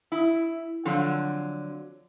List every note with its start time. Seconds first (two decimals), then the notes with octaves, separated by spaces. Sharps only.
0.12 E4
0.85 D3 F3 F#3 C4